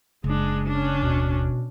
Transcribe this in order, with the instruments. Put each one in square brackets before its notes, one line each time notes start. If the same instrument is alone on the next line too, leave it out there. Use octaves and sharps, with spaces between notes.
[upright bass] F#1 [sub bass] C#3 [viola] G#3 D4
[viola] C#4 D4
[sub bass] D#2 [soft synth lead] B2